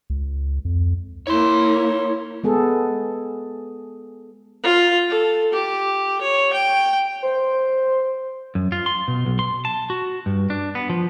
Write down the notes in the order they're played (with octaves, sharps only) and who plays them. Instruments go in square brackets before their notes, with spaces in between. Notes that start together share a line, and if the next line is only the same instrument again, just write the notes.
[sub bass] C#2
F2
[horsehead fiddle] A#3 E4 [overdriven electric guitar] C#5 C6
[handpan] G#3 B3 G#4 A4
[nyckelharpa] F4
A4
G4
C#5
G5
[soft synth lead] C5
[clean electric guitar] F#2
F4
C6
B2
B1
C6
A5
F#4
G2
D4
B3
F3